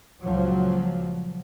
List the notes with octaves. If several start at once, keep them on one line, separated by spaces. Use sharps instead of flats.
C#2 A#2 F3 F#3